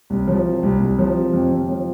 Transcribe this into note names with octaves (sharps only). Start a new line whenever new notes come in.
C2
F3
C3
C2
C2
F3
C3
F2
F2
F3